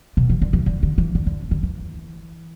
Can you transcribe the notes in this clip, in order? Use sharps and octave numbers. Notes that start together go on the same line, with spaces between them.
B2
E3
D3
E3
D3
D3
E3
D3
D3
D3
E3